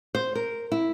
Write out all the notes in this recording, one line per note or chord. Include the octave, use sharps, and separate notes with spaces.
C5
A#4
E4